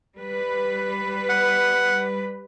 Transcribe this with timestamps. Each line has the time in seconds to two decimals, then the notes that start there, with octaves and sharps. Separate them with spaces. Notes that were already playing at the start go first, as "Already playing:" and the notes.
0.17 G3 B4
1.29 F#5